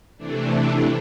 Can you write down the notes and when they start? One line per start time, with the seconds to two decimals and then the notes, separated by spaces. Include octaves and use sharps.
0.17 C3 E3 A3 D4